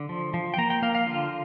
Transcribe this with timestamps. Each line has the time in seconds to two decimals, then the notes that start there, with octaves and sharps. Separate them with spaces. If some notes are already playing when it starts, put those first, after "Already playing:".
Already playing: D3
0.09 F3
0.34 F3
0.54 G5
0.58 A#3 A#5
0.70 G5
0.82 A#3 F5
0.95 F5
1.06 D3 F4